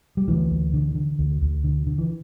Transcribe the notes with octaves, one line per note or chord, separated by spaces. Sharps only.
G3
D2 E3
D2
D3
D3
D2
D2
D3
D3
E3